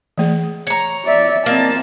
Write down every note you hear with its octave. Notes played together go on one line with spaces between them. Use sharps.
E3 A3 G#4
C#5 A#5
D5 E5
A#3 C4 D#5 A5